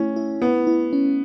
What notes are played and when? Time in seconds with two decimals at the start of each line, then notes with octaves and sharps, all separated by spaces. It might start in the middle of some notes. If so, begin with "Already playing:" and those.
Already playing: A3 C#4 E4
0.16 E4
0.42 B3 E4
0.67 E4
0.93 C#4